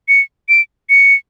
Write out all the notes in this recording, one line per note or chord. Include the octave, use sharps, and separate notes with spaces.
C#7
D7
C#7